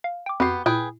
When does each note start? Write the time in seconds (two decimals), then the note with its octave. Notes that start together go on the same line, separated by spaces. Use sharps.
0.04 F5
0.26 G5 D6
0.40 F2 B3 F#4 G4 C7
0.66 A#2 E4 G#4 B4 G5